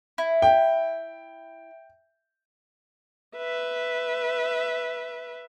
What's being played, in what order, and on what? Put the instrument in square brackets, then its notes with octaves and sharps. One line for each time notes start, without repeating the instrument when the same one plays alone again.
[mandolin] E4
[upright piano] G5
[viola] B4 E5